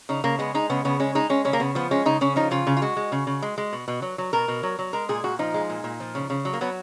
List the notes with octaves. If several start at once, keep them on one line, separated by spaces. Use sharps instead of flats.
C#3 D#4
C#3 A#3
G#3 B3
G#3 D#4
C#3 B3
C#3 B3
G#3 C#4
G#3 D#4
G#3 C#4
C#3 C#4
A#3
C#3 B3
F3 B3
G#3 C#4
C#3 D#4
C#3 C#4
F3 D#4
C#3 F4
C#3
F4
G#3 F#4
G#3
C#3
C#3
G#3
G#3
B2
B2
F#3
F#3
B2 A#4
B2
F#3
F#3
G#3 A#4
A#2 G#4
A#2 F#4
F3 D#4
G#3
A#2
A#2
F3
C#3
C#3
F#3
A#3
F#3 B3